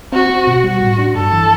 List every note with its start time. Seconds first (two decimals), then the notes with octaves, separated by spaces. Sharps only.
0.12 C4 F#4
0.30 C4
0.47 B2
0.63 G3 F#4
0.81 A2
0.98 D4
1.15 G2 A4
1.33 E3